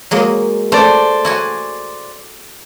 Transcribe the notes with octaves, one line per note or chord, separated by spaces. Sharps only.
F#3 G#3 A#3
A3 C5 D5
E4 F#4 G#5